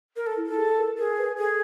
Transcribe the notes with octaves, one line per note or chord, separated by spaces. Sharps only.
A#4
A4
E4
A4
G#4
A#4
G#4 A#4
B4
G#4 A4